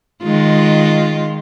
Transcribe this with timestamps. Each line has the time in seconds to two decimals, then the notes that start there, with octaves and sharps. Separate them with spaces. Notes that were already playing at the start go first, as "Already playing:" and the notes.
0.23 D#3 G#3 F4